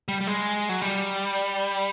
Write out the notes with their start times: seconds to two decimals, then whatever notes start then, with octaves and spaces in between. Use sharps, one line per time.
0.08 G3
0.21 G3
0.27 G#3
0.69 F#3
0.82 G3